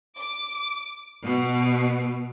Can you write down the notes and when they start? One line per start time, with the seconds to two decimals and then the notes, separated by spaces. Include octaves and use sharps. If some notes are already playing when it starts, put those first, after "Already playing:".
0.18 D6
1.24 B2